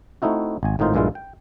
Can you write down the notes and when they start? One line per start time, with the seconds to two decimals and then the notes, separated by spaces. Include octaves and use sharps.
0.22 A3 C4 D#4 E4 F#4
0.63 G#1 G#5
0.79 G#1 A2 D#3 D#4 F4 C5
0.94 A#1 G2 A#2 G#3 E4 F4
1.15 G5